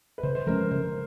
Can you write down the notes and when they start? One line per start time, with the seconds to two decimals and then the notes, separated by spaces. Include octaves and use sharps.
0.18 B4
0.23 C#3 C5
0.35 C5
0.47 F3 G#3 C#4 A#4
0.71 C#3 C5